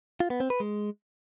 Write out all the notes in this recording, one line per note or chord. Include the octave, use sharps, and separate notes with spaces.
F4
B3
C4
B4
G#3